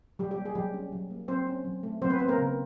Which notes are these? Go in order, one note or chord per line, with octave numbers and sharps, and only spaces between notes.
F#3 G3 G4
G3 G4
A#3
G#4
F#3 G3 G4
C#4
F#3
A#3
F#3 C4 C5
C#4
F#3
A3
F#3 C4 C5
B3 B4
C4 C5
A#3 A#4
C#3